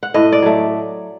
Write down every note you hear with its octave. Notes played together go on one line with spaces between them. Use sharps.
F#5
A2 D#5
D5
F#3 A3